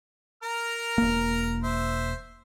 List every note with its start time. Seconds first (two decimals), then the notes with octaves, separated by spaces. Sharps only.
0.43 A#4 A#5 F6
0.98 E1 A#3
1.64 C5 E5